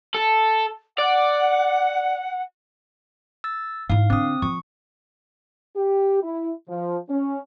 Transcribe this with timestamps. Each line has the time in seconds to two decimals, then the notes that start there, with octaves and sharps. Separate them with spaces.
0.15 A4
0.98 D5 F#5
3.44 E6 A6
3.90 G#2 E4 F5
4.10 D3 C4 E4 D#6
4.42 F3 C#6
5.76 G4
6.23 E4
6.69 F3
7.10 C#4